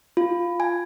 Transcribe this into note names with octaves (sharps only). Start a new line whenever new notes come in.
F4
G#5